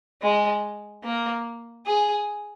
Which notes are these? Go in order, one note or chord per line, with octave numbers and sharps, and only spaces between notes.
G#3
A#3
G#4